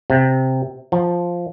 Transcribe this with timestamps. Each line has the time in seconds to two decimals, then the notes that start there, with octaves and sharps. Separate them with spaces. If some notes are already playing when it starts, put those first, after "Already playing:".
0.10 C3
0.92 F3